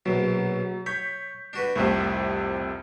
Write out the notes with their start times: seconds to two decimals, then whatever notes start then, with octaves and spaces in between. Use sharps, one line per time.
0.06 A#1 B2 F#3
0.86 C#5 G6 B6
1.53 D4 F#4 B4
1.76 C2 F2 A2 C3 F3 A3